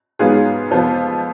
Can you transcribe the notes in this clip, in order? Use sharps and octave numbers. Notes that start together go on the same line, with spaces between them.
G#2 F#3 B3 F4 G#4
F2 F3 B3 F4